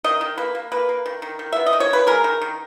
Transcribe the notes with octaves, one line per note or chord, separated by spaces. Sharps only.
D#3 D#5
D#3
A#3 B4
A#3
A#3 B4
A#3
D#3
D#3
D#3
B3 E5
D#5
D#3
C#5
D#3 B4
G#3 A#4
D#3
D#3